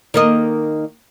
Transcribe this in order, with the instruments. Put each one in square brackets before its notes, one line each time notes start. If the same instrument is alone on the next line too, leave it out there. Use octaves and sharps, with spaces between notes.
[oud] D#3 A#3 D#5